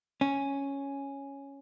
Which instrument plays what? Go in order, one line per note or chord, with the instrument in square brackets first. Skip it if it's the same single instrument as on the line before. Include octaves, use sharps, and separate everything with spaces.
[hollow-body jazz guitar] C#4